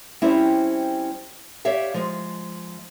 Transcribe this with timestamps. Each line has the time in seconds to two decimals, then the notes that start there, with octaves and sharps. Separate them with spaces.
0.22 G3 C4 C#4 E4 G4 C5
1.65 G4 C#5 D5 E5 F5
1.94 F3 G#3